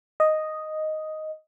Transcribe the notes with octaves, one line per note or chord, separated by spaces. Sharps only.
D#5